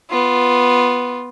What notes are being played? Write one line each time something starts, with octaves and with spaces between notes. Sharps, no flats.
B3 F4